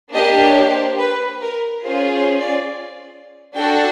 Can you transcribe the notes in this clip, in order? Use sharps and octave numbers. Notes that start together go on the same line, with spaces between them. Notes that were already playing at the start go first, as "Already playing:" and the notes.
A#3 D4 G4 D#5
C#5
C5
B4
A#4
C#4 F4 G#4 C5
C5
D5
D4 F#4 A4 G5